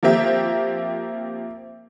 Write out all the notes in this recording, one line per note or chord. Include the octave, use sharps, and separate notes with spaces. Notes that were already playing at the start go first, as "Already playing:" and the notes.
F3 A#3 C4 G4 E5